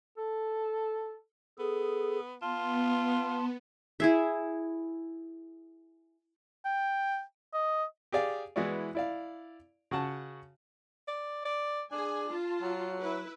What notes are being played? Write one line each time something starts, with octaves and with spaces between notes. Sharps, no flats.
A4
B3 G#4 A4
B3 F4 A5 C6
E4 G#4 E5
G5
D#5
G4 G#4 D5 F5
E3 G#3 B3 E4 F#4 D5
E4 D5 F5
C#3 F#4 F#5 A5
D5
D5
D4 G#4 G#5
F4 A5
F#3
E4 B4